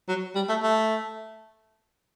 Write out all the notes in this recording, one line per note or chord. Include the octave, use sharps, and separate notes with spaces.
F#3
G3
A3
A3